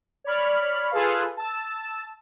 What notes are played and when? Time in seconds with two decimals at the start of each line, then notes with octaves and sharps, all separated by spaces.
0.24 C#5 D5 B5 F6
0.91 F4 G#4 A4 B4 F5
1.37 A5 E6